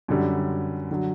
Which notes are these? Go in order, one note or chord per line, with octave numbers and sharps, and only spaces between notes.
F#2 D3 G3
D3 F#3